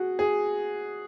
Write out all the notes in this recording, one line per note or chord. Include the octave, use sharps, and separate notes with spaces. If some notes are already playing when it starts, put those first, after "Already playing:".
Already playing: F#4 G#4
G#4